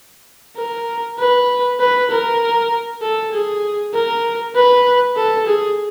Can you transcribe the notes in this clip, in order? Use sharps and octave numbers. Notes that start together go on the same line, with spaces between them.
A#4
B4
B4
A#4
A4
G#4
A#4
B4
A4
G#4